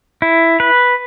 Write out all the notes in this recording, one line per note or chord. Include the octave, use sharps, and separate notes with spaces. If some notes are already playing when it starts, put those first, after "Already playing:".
E4
B4